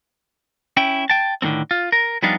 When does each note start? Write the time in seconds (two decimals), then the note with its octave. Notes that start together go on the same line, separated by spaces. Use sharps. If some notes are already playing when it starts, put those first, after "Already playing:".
0.77 C#4 E4 G5
1.10 G5 A5
1.42 A2 D3 D#3 A3 C4
1.71 F4
1.92 A#4
2.23 F3 G3 B3 D4 D#4 F4